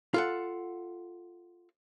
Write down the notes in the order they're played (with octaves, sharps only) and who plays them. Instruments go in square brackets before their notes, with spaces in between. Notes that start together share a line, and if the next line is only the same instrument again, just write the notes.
[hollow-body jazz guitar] F4 A4 F#5